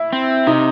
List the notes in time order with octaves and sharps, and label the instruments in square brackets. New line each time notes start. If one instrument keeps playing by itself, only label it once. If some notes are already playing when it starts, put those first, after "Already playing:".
Already playing: [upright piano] E4
[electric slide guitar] C4
[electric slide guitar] C3 [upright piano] D#4